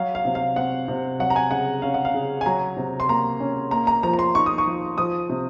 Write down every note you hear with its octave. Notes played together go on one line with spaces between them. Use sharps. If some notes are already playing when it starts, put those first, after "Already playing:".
Already playing: F#3 F5
F5
C3
F5
C4 F#5
C3
F#3 F#5
A#5
G#5
C#3 F#5
C#4 F5
F#5
F5
C#3
G#5
F#3 A#5
C3
C6
A#3 A#5
C#4
A#3 A#5
A#5
F3 A#5
A#5
C6
D#4 C#6
D#6
C#6
F3
F3 D#6
C3